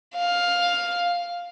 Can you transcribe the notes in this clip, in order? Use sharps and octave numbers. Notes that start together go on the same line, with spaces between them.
F5